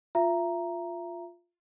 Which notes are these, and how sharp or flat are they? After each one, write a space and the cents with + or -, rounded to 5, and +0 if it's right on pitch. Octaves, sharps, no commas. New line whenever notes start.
F4 +5 E5 +30 A#5 +0